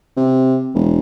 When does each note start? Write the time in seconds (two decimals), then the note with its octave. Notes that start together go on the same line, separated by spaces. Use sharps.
0.17 C3
0.74 E1